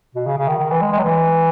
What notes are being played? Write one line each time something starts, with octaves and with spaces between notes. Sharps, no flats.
B2
C#3
C#3
D#3
D#3
E3
G#3
G#3
F#3
E3